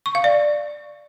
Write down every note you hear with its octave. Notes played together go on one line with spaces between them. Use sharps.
C#6
F5
D5